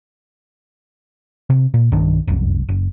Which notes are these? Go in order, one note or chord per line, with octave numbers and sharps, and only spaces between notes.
C3
A#2
B1 G2 D#3 D4
F1 C2 F#2
F#1